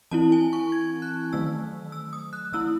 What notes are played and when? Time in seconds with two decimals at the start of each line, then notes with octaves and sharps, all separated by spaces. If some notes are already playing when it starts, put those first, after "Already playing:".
0.11 E3 C4 E4 A5
0.32 G#5
0.53 C#6
0.72 G#6
1.02 F#6
1.33 D#3 F#3 A3 E6
1.92 E6
2.13 D#6
2.33 F#6
2.53 E3 C4 E4 E6